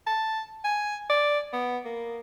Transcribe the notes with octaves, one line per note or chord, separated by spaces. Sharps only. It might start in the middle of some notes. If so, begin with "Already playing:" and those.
A5
G#5
D5
B3
A#3